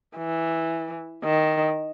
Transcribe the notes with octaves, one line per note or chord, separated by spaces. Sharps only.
E3
D#3